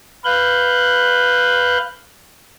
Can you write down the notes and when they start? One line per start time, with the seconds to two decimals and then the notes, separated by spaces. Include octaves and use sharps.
0.25 B4 F5 F#6 G6